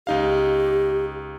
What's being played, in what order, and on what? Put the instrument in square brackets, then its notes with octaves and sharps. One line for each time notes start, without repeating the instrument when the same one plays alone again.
[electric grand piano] C#2 D#4 F5 [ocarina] G4